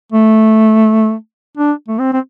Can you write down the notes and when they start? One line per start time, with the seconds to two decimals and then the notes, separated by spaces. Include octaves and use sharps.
0.12 A3
1.57 D4
1.88 A3
1.99 C4
2.13 C4